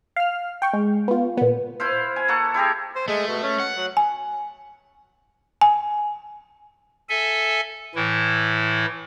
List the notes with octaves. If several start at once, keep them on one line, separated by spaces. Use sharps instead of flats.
F5 F6
G5 C#6
G#3
B3 F4
A#2 B3
E4 B4 C5 F5
G#5
A#3 A4 F#5 C#6
E4 G4 G#4 A#5
C5
G#3 A3
B2
C#4
F#5
F#3
G#5
G#5
A4 E5 G#5
A2 E3 E4